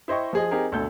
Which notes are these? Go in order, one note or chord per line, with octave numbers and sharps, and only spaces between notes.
E4 C5 D#5 G5 C#6
F3 G#4 D#5
C4 D#4 G4 G#4 A#4
G#1 D2 B2 A4 G6